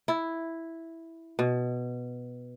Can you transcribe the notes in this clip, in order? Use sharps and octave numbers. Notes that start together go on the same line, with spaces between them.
E4
B2